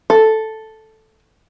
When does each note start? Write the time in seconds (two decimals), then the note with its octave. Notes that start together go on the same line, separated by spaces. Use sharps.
0.10 A4